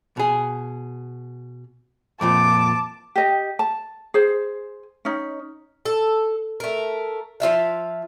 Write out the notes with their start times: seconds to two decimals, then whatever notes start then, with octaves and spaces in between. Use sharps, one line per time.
0.17 B2 G#4
2.21 F2 A#2 F3 A5 D6
3.16 G4 D#5
3.59 A5
4.14 G#4 C5
5.05 C#4 D#4
5.86 A4
6.60 A3 A#4
7.40 F3 F4 E5 F5